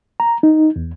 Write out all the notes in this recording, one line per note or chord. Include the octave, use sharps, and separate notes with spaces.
A#5
D#4
E2